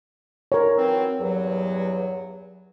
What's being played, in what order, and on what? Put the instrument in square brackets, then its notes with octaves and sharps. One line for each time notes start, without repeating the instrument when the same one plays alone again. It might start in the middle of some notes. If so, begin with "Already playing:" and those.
[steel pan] A#4 C#5
[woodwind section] E3 F#3 C4
E2 G2 F#3